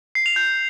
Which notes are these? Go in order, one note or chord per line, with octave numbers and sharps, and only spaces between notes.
C7
F7
G6